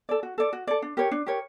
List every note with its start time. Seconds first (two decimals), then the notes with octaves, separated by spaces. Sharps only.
0.09 A4 D5
0.23 F#4
0.38 A4 D5
0.53 F#4
0.67 A4 D5
0.82 D4
0.97 G4 A#4 C#5
1.11 D4
1.26 G4 A#4 C#5